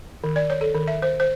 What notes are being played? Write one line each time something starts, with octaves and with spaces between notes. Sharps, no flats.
D#3
D5
C#5
A4
D#3
E5
C5
C5